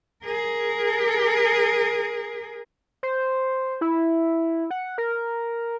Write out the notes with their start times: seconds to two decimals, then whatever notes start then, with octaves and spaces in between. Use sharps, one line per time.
0.24 G#4 A#4
3.03 C5
3.81 E4
4.71 F#5
4.98 A#4